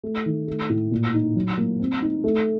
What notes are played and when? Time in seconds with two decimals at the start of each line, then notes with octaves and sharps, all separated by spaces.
0.03 A3
0.26 D#3
0.47 A3
0.69 A2
0.91 A#2
1.14 D#4
1.36 F#3
1.58 A#3
1.80 C4
2.02 D#4
2.24 A3